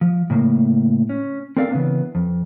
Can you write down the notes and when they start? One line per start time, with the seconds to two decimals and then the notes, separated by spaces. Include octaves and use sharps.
0.01 F3
0.30 A2 C#3 A#3
1.09 C#4
1.57 C4 A4 A#4 D5 F5
1.71 C#3 E3 A#3 B3 C#4 D4
2.15 F2